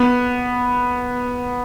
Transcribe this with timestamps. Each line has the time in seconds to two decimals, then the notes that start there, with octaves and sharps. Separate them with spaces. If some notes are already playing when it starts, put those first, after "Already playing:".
Already playing: B3